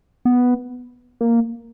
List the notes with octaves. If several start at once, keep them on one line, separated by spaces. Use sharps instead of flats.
B3
A#3